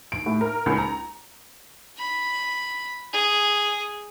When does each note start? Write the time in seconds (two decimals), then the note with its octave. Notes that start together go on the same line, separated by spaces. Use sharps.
0.12 D7
0.26 A2
0.41 A#4
0.66 C#2
0.78 A#5
1.98 B5
3.13 G#4